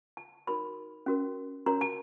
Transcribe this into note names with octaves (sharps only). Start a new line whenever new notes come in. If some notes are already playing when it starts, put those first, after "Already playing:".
A5
D#4 F#4 A#4 C#5 B5
C#4 F#4 A#4 C#5
C#4 F#4 A#4 C#5 A#5
A5